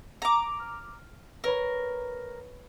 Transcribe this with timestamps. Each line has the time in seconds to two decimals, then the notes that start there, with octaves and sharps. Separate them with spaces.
0.22 A#5 D6
0.59 F6
1.44 A#4 B4 C#5 B5